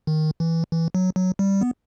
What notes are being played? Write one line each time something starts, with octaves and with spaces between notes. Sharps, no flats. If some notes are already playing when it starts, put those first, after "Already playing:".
D#3
E3
E3
F#3
F#3
G3
B3